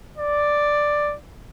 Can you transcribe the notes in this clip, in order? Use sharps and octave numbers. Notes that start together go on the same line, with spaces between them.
D5